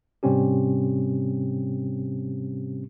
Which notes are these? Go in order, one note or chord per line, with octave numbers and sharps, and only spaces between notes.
G#2 C3 G3 C4 C#4 G4